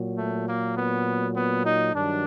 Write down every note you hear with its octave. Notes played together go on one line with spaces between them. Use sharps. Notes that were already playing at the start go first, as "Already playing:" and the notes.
Already playing: A#2 F#3
A3
A#3
B3
B3
D#4
G2 D#3 F#3 D4